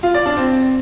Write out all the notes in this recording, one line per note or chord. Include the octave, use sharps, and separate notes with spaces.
F4
D5
D4
C4